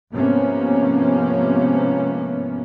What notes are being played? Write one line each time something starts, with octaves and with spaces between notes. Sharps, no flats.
G#2 C3 F3 A#3 B3 C#4